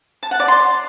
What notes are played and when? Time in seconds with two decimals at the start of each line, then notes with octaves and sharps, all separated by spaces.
0.23 A5
0.31 F#5
0.40 D5
0.48 C6